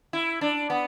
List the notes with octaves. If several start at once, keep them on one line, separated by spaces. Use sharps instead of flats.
E4
D4
B3